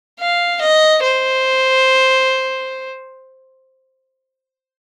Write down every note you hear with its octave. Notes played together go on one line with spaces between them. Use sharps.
F5
D#5
C5